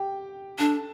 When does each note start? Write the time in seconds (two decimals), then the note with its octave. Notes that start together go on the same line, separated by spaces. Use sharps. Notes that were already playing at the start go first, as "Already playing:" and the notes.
Already playing: G4 G5
0.59 D4 A4 A5